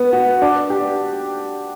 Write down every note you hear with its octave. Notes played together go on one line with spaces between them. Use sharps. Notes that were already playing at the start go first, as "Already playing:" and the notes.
Already playing: B3
F#4
D4
G4